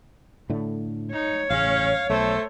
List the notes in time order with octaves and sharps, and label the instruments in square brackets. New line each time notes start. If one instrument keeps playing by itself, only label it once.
[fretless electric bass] A2 D3 A3
[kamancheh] D#4 [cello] C#5
[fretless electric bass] A1 C#3 [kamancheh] C#4 [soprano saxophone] F5
[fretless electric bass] B1 [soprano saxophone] A3 [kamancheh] A4 C5